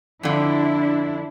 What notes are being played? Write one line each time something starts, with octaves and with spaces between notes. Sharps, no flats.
F2 D3 D4 E4